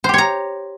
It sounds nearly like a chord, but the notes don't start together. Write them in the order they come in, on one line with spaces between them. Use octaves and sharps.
C5 G4 C#5 A#5